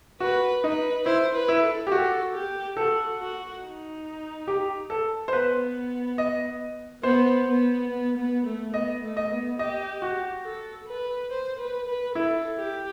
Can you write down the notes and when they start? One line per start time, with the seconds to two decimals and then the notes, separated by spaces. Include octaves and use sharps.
0.20 F#4 B4
0.63 D#4 B4
1.06 E4 C5
1.34 B4
1.48 E4
1.63 A4
1.87 G4
1.91 F#4 A4
2.34 G4
2.77 F#4 A4
3.20 F#4
3.63 D#4
4.48 G4
4.90 A4
5.28 C5
5.33 B3 B4
6.18 D#5
7.03 B3 C5
7.46 B3
7.89 B3
8.17 B3
8.46 A3
8.74 B3 D#5
9.03 A3
9.17 D#5
9.31 B3
9.59 G4 D#5
10.02 F#4
10.45 A4
10.87 B4
11.30 C5
11.59 B4
11.87 B4
12.15 E4 A4
12.58 G4